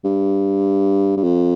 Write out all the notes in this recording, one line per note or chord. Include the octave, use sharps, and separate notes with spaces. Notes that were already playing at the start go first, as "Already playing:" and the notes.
G2
G2
F2